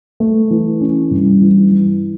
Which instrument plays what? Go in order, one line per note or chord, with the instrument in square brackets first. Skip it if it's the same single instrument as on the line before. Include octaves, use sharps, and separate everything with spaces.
[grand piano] A3
E3
C#4
G2
E3
E3